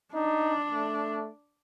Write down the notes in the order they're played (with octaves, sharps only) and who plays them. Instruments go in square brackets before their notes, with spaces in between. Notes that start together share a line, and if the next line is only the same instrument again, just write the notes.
[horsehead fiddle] D4 [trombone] D#4
[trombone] A3